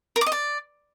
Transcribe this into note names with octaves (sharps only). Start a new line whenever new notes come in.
A#4
D6
D#5
D5